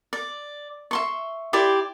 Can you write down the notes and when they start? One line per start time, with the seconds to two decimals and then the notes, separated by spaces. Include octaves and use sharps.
0.13 D5
0.91 E5 C6 C#6
1.53 E4 G4 D5 C6